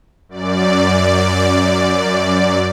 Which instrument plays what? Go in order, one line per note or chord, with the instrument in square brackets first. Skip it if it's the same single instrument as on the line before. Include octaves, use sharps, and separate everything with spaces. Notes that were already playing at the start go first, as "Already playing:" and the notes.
[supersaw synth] F#2 D5